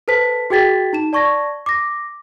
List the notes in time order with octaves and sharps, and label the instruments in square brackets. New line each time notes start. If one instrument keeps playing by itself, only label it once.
[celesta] A4 B4 C5 A5 B6
F#4 G#4 G5 G#6 A6 B6
D#4 A5 E7
D5 A5 C#6 G#6 A#6
D6 A#6